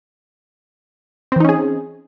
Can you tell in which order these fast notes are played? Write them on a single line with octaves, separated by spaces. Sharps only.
C4 E3 D#4 C#4 G#4